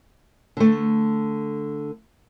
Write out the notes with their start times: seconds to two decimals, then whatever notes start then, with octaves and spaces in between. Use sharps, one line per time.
0.57 D3 A3